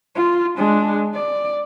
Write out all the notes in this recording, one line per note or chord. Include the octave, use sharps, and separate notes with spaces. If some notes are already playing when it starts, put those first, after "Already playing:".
F4
G#3 D4
D5